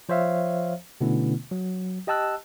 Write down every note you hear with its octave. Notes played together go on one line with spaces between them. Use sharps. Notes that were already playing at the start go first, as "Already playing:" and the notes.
F3 C5 C#5 E5 F5
B2 D3 A3 B3 C#4 E4
F#3
G4 D#5 G5 A5 E6 F#6